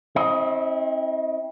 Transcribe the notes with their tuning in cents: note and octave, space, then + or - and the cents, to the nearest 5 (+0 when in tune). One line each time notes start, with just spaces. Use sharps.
C4 +30 E4 -30 D#5 +15